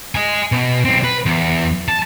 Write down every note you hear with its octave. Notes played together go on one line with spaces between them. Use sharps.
D#5 G#5
B2
B1 C4
B4
E2
A5